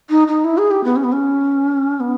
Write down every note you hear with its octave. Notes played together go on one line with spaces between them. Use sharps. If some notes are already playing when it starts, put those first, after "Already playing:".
D#4
D#4
E4
G#4
G4
B3
C#4
B3
C#4
B3